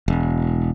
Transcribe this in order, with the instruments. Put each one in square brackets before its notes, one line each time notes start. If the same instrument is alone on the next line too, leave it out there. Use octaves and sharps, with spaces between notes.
[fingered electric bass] E1